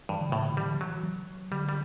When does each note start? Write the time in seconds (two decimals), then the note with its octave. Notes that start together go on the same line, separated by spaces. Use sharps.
0.09 G2 E3
0.19 D3
0.30 A2 C#3
0.40 D3
0.56 E3 G3
0.66 D3
0.75 E3
0.81 F#3
1.03 F#3
1.51 D3 G3
1.69 G3